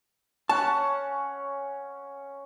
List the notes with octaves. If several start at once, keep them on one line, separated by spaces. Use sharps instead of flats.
C#4 F#5 A5